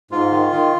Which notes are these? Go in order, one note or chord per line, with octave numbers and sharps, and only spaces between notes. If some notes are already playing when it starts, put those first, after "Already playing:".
G#2 F4
D#3
D#3